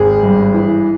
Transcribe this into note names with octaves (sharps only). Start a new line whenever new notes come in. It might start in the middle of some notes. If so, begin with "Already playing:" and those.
Already playing: G#1 G#4
G2
E3